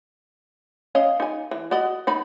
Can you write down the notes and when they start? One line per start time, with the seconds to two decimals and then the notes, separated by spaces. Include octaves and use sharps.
0.95 C#4 D#5 F5
1.20 D#4 G#5
1.51 E3
1.71 F#4 D5 D#5
2.07 D#3 D#4 B5